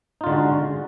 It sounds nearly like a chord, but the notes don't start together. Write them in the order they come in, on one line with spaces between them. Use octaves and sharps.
D#4 F4 D3 G#3 F#4